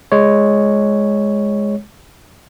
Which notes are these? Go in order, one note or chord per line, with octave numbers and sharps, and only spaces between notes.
G#3 C#5